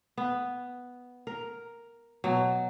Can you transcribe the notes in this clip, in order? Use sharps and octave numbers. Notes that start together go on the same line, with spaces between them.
B3
A#4
B2 F#3